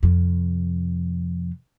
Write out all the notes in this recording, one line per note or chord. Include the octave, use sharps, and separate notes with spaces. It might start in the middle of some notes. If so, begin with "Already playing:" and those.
F2 C3